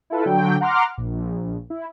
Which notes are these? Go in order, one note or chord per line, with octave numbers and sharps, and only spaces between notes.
E4 F4 A4 B4
D3 F#3 G5
F#5 A#5 C6 D6 F6
A#1
E4